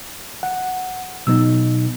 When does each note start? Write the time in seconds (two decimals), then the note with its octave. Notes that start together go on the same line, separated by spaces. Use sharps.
0.43 F#5
1.27 B2 F#3 B3 D#4 E6